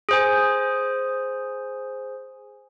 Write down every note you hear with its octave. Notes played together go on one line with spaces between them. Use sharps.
G#4 C5 G#5